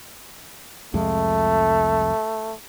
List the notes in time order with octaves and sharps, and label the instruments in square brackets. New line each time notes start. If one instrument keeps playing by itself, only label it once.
[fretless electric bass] C2 F2 G#3 [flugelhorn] A3